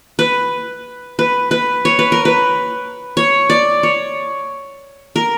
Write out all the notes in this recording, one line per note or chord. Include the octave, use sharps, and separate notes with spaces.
B4
B4
B4
C#5
B4
A#4
B4
C#5
D5
C#5
A#4